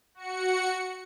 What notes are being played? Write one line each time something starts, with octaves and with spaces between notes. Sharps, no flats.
F#4 C#7